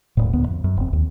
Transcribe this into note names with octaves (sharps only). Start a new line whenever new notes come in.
D#1 A2
D2 B3
F2
F#2
E1 C4
D#2